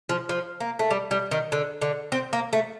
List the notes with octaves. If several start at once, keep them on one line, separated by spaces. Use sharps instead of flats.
F3
F3
A#3
A3
G3
G3
D#3
D3
D3
C4
A#3
A3